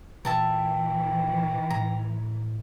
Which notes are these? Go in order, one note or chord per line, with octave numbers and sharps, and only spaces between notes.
A#2 E3 E5 G5 A5 A#5
A2 A#5